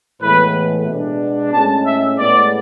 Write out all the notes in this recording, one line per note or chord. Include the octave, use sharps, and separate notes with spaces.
A2 E3 G#3 B3 B4
B2 G#3 B3 D4
A2 G#3 C#4 A5
E5
A2 G#3 B3 D5